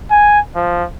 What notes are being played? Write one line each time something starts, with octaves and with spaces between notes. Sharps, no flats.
G#5
F3